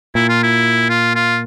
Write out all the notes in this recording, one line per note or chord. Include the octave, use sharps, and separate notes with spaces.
A#2 E4
F4
E4
F4
F4